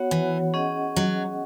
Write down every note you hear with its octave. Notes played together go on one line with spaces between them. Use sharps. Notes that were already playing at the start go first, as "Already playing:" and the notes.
Already playing: B3 F#4 C#5 F#5
E3
C#4 G#4 D#5 F#5
F#3